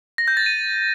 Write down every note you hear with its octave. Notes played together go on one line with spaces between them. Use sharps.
A#6
G6
A6
D#7